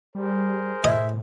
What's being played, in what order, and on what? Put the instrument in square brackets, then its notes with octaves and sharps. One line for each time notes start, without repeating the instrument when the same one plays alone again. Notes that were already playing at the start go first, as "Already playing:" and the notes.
[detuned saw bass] G3 [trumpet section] G#4 A#4 C5
[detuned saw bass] A2 [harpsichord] D#5 [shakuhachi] E5